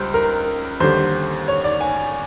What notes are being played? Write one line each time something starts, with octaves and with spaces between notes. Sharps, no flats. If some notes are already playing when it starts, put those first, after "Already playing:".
Already playing: C#2 G3 C5
A#4
D#2 D3 G3 C5
C#5
D5
G#5